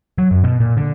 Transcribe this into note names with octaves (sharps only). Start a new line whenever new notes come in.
F#3
F#2
B2
A#2
D3